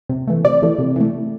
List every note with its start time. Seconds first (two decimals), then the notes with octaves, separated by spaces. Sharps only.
0.09 C3
0.28 E3 A3
0.44 C3 D5
0.62 E3 A3
0.79 C3
0.96 E3 A3